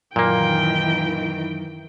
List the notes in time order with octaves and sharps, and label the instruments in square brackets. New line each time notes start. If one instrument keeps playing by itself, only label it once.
[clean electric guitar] F#2 [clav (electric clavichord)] A#2 A#3 [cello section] D#3 E3 [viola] G5